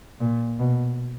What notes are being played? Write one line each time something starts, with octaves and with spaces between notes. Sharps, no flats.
A#2
B2